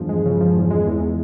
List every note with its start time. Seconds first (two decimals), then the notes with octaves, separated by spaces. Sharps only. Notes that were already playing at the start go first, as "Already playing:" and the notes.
Already playing: E2 G2 F3
0.09 G#3
0.25 C#3
0.41 F3
0.56 E2
0.71 G#3
0.87 E2